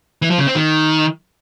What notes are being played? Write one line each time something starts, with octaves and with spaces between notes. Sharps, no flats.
E3
F3
C#3
C4
D#3